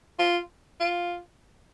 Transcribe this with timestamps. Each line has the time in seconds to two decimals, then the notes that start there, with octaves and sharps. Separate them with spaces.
0.19 F4
0.80 F4